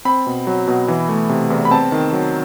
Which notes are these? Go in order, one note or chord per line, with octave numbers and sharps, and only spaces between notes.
C4 B5
B2
F#3
B2
E3
A3
C3
E2
B5
C4 A5
D#3
F#3